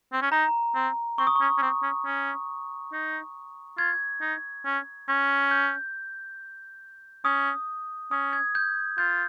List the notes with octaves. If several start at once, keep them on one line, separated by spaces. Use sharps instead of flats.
C4
C#4
D#4 A#5
C4
C4 C#6
D#6
C#6
C#4
C#4
C4
C#4
C#4
D#4
F4 G#6
D#4
C#4
C#4
G6
C#4 D#6
C#4 D#6
G#6
G6
F4 G6